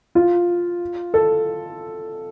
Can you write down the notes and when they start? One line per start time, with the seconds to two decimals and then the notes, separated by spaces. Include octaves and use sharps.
0.15 F4
1.14 A4